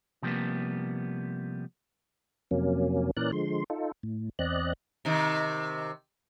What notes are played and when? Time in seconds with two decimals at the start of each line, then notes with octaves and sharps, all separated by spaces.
0.22 C3 F3 G3 G#3 A#3 B3
2.51 F2 C3 F#3 A#3 C#4
3.17 A#2 E3 C#4 A#4 D5 F#6
3.32 D3 F3 G#3 C6
3.70 D#4 F4 A4
4.03 A2
4.39 E2 C4 D5 D#5 F#6
5.05 C3 D#3